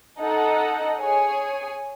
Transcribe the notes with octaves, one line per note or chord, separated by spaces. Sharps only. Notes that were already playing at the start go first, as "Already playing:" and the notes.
D#4 A4 D#5 F#5
G#4 C#5 G#5